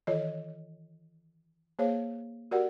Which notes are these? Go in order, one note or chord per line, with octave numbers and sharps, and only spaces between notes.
D#3 E3 F4 A4 C#5 D#5
A#3 G#4 C5 C#5 F5
F#4 G4 A#4 D5 F#5